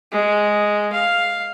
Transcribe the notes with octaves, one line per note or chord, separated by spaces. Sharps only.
G#3
F5